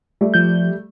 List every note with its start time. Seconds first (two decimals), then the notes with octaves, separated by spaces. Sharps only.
0.21 G3 A3 D5
0.34 F3 G6